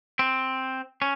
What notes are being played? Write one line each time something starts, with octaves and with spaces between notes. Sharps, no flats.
C4
C#4